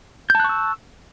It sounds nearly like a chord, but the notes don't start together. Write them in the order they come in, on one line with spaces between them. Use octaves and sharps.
G6 A5 F#6 C#6 E6